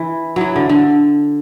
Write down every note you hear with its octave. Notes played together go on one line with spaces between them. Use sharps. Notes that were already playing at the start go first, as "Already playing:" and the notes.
Already playing: E3
E3 F#3
D3
D3